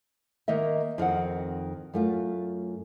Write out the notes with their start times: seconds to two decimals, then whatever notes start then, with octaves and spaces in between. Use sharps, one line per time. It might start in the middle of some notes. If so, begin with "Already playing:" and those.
0.48 D#3 A#3 D#5 E5
0.98 F2 D#3 C4 F#5
1.94 F#2 A3 F4